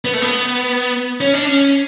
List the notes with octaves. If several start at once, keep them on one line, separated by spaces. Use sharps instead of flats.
B3
A3
B3
C#4
D4
C#4